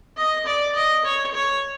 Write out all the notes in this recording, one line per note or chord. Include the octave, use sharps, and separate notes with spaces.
D#5
D5
D#5
C#5
C#5